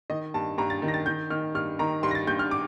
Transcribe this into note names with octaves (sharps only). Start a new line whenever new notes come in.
D#3 D#5
G2 A5
G2 A#5
A6
D#3
A#6
A6
D#3 G6
D#3 F6
G2 F6
D#3 A#5
G2 C6
A#6
A6
G2 G6
F6
D6